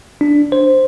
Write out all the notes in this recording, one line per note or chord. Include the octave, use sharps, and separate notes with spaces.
D4
C5